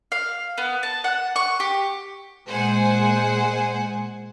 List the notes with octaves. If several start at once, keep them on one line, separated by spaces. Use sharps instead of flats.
F5
B3
A5
F#5
C#6
G4
A#2 G#3 C5 F#5 G#5